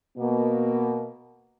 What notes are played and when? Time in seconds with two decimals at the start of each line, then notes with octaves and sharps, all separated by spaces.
0.17 B2 A#3